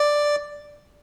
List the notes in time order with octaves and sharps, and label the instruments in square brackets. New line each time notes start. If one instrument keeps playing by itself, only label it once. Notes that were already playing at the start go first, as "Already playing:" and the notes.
Already playing: [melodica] D5